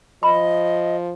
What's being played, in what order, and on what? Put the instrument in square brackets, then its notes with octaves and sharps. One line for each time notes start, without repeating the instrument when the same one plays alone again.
[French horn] F3 [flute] D#5 [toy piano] B5